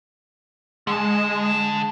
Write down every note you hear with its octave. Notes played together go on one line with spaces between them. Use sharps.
D3 G#3 A5